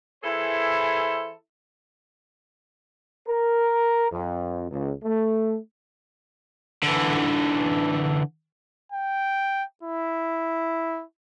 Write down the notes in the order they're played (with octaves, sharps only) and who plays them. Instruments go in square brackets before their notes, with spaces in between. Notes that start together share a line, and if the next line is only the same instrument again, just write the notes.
[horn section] E3 E4 G#4 A4 C5
[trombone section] A#4
F2
C#2
A3
[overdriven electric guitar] D3 E3
[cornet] G5
E4